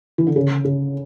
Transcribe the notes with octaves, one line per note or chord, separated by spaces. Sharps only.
E3
D3
C#3
C#3